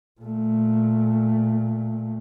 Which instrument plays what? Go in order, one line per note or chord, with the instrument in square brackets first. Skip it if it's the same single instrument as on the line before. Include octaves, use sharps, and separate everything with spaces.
[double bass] A#2 A3